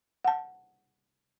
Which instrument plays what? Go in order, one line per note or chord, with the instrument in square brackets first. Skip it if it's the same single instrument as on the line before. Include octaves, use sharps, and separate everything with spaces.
[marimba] F#5 A5